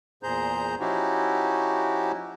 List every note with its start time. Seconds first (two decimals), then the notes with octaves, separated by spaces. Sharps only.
0.23 E2 A#2 G#4 C5 A#5 G6
0.80 F3 C#4 D#4 E4 F#4 G4